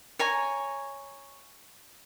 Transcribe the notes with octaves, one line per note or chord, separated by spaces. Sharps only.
C#5 G#5 A#5